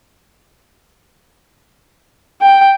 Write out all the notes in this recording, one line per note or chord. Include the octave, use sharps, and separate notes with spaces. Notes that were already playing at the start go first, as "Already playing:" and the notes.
G5